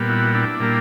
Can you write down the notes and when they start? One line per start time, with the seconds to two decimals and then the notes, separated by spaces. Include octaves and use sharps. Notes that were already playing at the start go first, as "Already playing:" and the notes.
Already playing: A#2 G3 B3
0.09 E4 F#4
0.34 D4 E4
0.60 A#2 G3 A#3